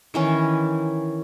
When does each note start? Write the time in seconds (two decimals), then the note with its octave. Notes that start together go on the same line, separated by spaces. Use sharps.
0.14 D#3 E3 C#4